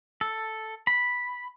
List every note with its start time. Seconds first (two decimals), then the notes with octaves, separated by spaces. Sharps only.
0.21 A4
0.87 B5